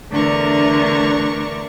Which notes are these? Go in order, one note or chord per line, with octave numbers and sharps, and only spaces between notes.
E2 D3 A3 D4 A#4 C#6